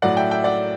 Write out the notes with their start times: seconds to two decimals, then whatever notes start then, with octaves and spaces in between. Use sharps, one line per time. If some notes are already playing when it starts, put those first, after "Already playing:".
0.02 A2 F#3 D5 F#5
0.17 E5 G5
0.31 E5 G5
0.44 D5 F#5